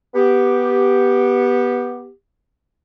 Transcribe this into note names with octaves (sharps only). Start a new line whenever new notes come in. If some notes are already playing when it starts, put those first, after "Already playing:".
B3 G4